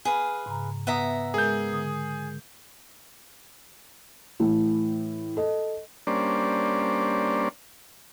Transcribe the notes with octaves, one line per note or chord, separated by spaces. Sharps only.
G#4 B4 F5 G#5
G#2 C#3 A#5
B3 E5 F#5 A#5 D#6
G#3 G#4 A#4 G6
D3 D#6
A2 E3
A4 D#5
G3 A#3 C#4 D4 C5 D5